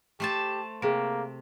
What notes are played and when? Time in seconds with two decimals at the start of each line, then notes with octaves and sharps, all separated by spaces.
0.20 A3 G4 C5 A5
0.82 C3 A#3 G#4 D7